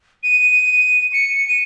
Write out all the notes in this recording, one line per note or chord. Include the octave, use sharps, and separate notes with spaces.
D#7
C#7
D#7